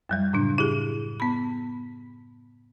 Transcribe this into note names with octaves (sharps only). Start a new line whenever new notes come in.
F#2 F#3 G3
A2 C#3 D4
E4 G4 G#4
B3 B5